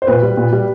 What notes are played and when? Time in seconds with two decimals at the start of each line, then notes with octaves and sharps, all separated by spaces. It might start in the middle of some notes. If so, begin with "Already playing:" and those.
0.02 C5
0.07 A#2 B4
0.22 G3
0.37 A#2
0.52 G3